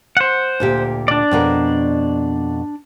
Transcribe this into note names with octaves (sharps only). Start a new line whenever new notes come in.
C5 F#5
D2 A#2 G4
D4 D5
F2 B2 A#4